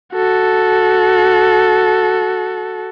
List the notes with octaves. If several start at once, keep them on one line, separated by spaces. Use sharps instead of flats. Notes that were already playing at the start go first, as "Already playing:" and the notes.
F#4 A4